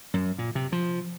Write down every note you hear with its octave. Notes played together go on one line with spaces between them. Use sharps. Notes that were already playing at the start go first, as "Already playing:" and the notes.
F#2
A#2
C3
F3